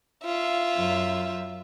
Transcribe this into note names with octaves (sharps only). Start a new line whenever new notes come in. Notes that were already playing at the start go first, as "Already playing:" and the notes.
F4 E5
F#2